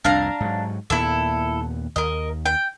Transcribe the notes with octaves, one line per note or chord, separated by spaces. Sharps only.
C2 F2 D4 F5 A#5
G#2 F#3
D#2 A#2 B3 E4 A4
D#2 A#4 D#5
G5